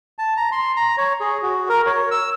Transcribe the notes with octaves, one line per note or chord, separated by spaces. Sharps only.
A5
A#5
C6
A#5
C#5
G#4
F#4
A#4
C#5
E6